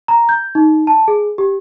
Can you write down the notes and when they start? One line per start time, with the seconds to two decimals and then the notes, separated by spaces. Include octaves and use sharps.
0.08 A#5
0.29 G6
0.55 D#4
0.87 A5
1.08 G#4
1.38 G4